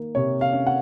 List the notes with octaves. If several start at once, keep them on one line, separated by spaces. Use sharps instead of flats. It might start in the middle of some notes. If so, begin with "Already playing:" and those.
Already playing: D#3 A#3
C3 C#5
F5
C#4
F#5